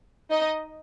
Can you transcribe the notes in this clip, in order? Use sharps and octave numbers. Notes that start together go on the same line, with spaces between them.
D#4 D#5